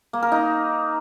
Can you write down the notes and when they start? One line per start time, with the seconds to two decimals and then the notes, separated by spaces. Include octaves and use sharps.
0.13 A#3
0.22 A#4
0.32 D#4